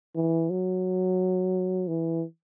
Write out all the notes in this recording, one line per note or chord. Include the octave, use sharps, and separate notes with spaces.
E3
F#3
E3